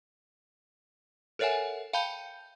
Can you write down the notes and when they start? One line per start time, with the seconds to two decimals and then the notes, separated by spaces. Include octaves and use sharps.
1.39 A4 A#4 C#5 E5 F#5 G#5
1.93 F5 G5 A5 B5 G6